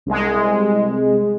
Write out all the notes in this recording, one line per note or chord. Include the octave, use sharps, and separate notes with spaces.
C2 G#3